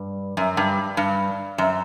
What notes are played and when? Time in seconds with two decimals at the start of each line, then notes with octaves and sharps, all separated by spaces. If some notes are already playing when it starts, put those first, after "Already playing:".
Already playing: G2
0.37 F#2
0.57 G2
0.97 G2
1.58 F#2